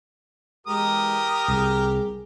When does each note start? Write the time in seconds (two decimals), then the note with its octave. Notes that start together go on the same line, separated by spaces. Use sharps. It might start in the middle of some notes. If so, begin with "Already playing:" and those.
0.67 E2 G#3 G4 A#4 D#6
1.48 C2 G#4